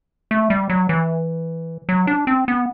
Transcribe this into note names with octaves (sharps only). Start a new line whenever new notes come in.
A3
G3
F#3
E3
F#3
D4
C4
B3